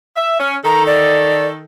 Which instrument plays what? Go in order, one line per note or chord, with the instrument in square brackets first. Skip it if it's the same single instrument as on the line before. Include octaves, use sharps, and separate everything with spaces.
[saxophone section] E5
C#4
[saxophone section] D#3 A4 [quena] A#5
[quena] D5